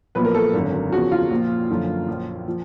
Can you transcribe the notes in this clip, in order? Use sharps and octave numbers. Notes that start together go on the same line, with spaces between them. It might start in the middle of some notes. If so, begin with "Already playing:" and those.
B1 A#2 F3 B4
A#4
A4
G#1 F#2 D3
E2 C#3 F3 F#4
F4
A#1 A#2 F3
F#1 F#2 D3 F3
A#1 A#2 F3
F3